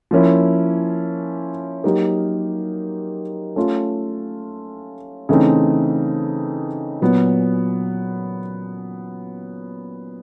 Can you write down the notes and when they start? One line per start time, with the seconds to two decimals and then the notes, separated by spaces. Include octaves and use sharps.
0.11 F3 A#3 C#4 E4
1.84 F#3 A#3 D#4 G4 A#4
3.56 A3 C#4 F4
5.29 C#3 E3 A3 C4 D#4
7.01 A#2 F#3 B3